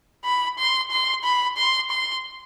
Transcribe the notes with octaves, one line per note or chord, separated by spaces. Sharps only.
B5
C6
C6
B5
C6
C6